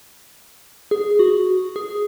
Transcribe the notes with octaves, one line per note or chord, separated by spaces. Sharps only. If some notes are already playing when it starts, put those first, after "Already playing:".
G#4
F#4
G#4